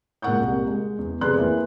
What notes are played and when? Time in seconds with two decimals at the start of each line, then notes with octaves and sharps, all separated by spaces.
0.22 A#2 G#3 A#4 F#5 C#6 G6
0.40 C2 A#3
0.67 G#3
0.99 E2
1.21 F1 B3 G#4 D5 C6 F#6
1.37 E3 A#3